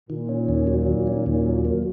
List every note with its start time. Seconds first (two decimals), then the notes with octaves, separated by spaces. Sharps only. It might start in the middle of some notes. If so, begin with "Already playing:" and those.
0.09 A#2 D#3
0.29 C#4
0.48 D#2
0.67 F#3
0.87 D#3
1.07 C#4
1.26 D#2 A#2
1.46 F#3
1.65 A#3